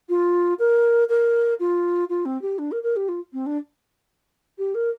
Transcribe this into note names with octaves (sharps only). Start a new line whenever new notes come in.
F4
A#4
A#4
F4
F4
C4
G4
D4
A#4
A#4
G4
F4
C4
D4
G4
A#4